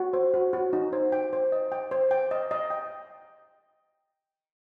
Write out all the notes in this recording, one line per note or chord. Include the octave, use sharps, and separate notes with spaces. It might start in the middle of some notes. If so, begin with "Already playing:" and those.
Already playing: F#4
C5
F#4
F#4
D#4
C5
G5
C5
D#5
G5
C5
G5
D#5
D#5
G5